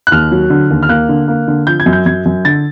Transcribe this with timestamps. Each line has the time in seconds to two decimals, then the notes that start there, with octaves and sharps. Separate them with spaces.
0.07 F#6
0.12 D#2 F6
0.32 F#3
0.50 D3
0.70 D#2
0.83 F6
0.89 A#3 F#6
1.09 D3
1.28 A#3
1.48 D3
1.67 F3 G6
1.80 G#6
1.86 F#2
1.93 G6
2.06 F#2 G#6
2.26 F#2
2.45 D3 A6